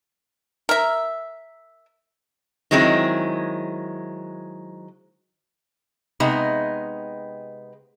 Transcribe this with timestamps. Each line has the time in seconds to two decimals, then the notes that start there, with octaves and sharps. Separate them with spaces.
0.69 A#4 E5
2.71 D#3 F#3 G#3 C4 E4
6.20 C3 G#3 B3 D#4